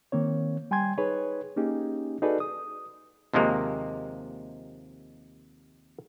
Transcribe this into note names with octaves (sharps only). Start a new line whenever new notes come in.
D#3 A#3 C4 C#5
G3 G5 G#5 C6 G#6
D#4 G#4 B4 C#5
A#3 C#4 D#4 G4 G#4
D#4 F#4 G#4 A4 B4 D5
D#6
D#2 C3 F3 G#3 A#3